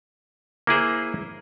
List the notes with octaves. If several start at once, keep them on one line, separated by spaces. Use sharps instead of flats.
A#3 E4 G#4 C5